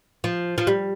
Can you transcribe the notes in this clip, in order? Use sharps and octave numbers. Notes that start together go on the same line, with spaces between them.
F3
F3
G3